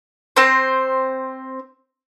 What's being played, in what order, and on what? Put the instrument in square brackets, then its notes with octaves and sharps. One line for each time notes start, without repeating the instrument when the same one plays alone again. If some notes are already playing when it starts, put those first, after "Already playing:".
[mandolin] C4 C5